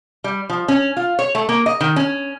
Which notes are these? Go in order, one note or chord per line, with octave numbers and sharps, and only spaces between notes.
G3
F3
C#4
F4
C#5
A3
A#3
D#5
D#3
C#4